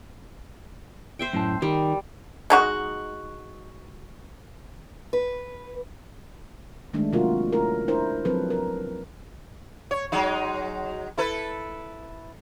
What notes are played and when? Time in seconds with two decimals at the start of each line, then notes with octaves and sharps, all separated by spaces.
1.19 C5 E5 G5
1.33 F#2 A2 A5
1.62 D#3 G3
2.50 G#3 D#4 F#4
5.13 B4
6.93 D#3 G#3 A3 D4
7.13 C3 F#3 A#3 F4 F#4 A#4
7.53 A3 C#4 E4 A#4
7.88 D4 E4 A#4 C5
8.25 F3 F#3 C4 A4 B4
8.50 A#4
9.91 C#5
10.12 F#3 G#3 D#4
11.18 E4 A4 B4